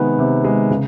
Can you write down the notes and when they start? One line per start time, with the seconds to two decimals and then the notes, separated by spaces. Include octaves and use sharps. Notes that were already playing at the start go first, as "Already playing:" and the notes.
Already playing: C3 D#3 G#3 B3
0.19 C3
0.44 G#3
0.71 C#3